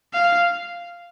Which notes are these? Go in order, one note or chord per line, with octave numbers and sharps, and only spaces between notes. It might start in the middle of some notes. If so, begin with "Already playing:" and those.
F5